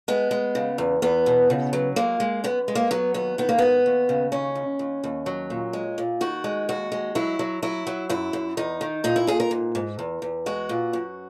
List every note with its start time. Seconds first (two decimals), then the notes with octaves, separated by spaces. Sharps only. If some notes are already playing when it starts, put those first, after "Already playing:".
0.08 G#3 B3
0.31 G#3
0.55 C#3
0.78 E2
1.02 E2 B3
1.26 B2
1.50 C#3
1.73 F#3
1.96 G#3 A#3
2.20 G#3
2.44 F#2 B3
2.68 G#3
2.75 A#3
2.91 F#3 B3
3.14 D#2 B3
3.38 D#3 B3
3.49 A#3
3.58 G#2 B3
3.86 D#2
4.09 C#3
4.32 D#2 C#4
4.55 D#2
4.79 D#2
5.04 D#2
5.26 F#3
5.50 A#2
5.73 G#3
5.98 A#2
6.21 D#3 F#4
6.44 G#3
6.69 D#2 F#4
6.92 G#3
7.15 F#3 E4
7.39 F#3
7.63 F#3 E4
7.87 F#3
8.09 F#2 E4
8.33 F#2
8.57 E2 D#4
8.81 D#3
9.04 A#2 D#4
9.16 E4
9.27 A#2 G#4
9.40 A#4
9.51 G#2
9.75 G#2
9.99 E2
10.22 E2
10.46 G#3 F#4
10.69 A#2
10.93 F#2